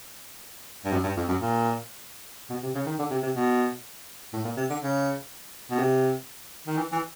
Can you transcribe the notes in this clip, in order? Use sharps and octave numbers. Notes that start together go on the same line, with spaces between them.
G2
F#2
G2
F2
F#2
A#2
B2
C3
C#3
D#3
D3
C3
C3
B2
A2
A#2
C3
D3
C#3
B2
C3
D#3
E3
E3